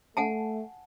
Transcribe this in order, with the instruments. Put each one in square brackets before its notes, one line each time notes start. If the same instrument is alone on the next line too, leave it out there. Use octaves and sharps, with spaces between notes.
[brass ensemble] A3 [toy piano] F#5 G#5 A5